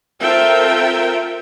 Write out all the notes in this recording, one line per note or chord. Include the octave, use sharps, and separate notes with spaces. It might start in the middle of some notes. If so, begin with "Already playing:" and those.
C4 F4 A4 A#4 E5 G5